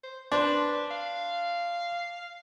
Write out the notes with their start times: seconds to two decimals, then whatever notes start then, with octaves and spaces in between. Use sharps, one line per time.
0.03 C5
0.32 D4 B4 C5
0.90 F5